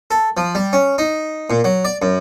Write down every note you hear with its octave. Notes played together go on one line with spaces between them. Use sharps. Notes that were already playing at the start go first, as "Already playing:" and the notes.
A4
F3
G3
C#4
D#4
A#2
F#3
D5
F#2